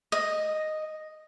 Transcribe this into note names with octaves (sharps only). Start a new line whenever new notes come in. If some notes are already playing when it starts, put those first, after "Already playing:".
D#5